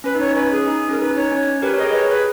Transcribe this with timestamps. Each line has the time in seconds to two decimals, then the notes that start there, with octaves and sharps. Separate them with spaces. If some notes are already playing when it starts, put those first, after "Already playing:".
0.04 C#4 B4
0.15 D#4
0.20 C#5
0.26 D#4
0.36 C#4 B4
0.51 G#4
0.68 D#4
0.79 D#4
0.89 C#4
0.91 A#4
0.99 D#4 B4
1.16 D#4 C#5
1.32 C#4
1.62 G4 A#4 B4
1.73 A#4 C#5
1.79 G#4 B4 D#5
1.94 C#5
2.10 B4